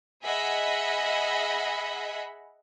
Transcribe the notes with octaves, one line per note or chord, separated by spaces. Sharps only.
G#4 D#5 E5 F#5 B5